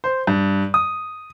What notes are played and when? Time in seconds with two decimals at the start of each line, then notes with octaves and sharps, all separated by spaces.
0.04 C5
0.27 G2
0.74 D#6